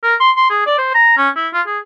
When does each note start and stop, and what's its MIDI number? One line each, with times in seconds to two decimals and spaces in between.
0.03 0.15 70
0.20 0.31 84
0.37 0.47 84
0.50 0.63 68
0.66 0.75 74
0.78 0.91 72
0.94 1.15 82
1.18 1.29 61
1.36 1.48 64
1.54 1.61 65
1.67 1.79 68